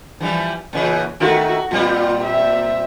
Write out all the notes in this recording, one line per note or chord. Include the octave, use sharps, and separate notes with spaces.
E3 F3 G3
A#2 C#3 E3
D#3 A3 F#4
A#2 G3 C4 F4
E5